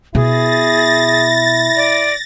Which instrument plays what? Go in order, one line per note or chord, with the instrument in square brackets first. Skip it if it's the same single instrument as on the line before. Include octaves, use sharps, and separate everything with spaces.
[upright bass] B2 [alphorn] E4 [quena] G#4 [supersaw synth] A6 A#6
[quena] D5